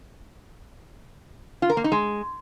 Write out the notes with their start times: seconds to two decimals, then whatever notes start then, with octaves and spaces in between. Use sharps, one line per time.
1.62 F4
1.70 A#4
1.77 A#3
1.84 D#4
1.92 G#3